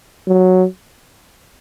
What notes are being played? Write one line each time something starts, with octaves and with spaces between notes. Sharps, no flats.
F#3